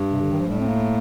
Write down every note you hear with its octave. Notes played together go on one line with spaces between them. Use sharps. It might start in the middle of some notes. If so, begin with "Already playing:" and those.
Already playing: G2
C3
D3
D#3
F3
A2 G3
C4
A#3